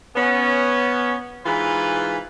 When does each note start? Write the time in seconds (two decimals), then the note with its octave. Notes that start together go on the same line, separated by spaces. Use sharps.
0.16 B3 C#4
1.46 G#2 E3 F4 B4